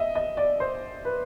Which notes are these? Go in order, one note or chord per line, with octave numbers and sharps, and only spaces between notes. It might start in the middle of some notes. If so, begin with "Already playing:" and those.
Already playing: D#5 E5
D#5
D5
C5
B4